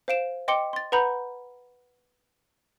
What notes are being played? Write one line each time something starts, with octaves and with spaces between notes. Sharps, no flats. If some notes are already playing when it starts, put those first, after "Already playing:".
C5 F5 D7 E7
D#5 G5 C6 D6 C#7 G7
C6 A6
B4 F#5 A#5 B5 G6